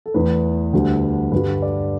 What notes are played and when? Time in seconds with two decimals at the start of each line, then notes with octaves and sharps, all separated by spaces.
0.06 A4
0.14 E2 E3 A3 B4
0.73 D2 D3 G3
1.32 G2 D3 G3 B4
1.62 D5